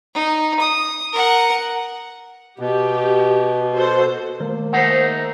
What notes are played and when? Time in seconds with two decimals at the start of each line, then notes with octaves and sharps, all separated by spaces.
0.14 D#4
0.59 D#6
1.13 A#4 F#5
2.59 B2 G4
3.75 F#4 A4 C5
4.40 D#3 A#3
4.73 A3 D#4 G#4 C5 F#5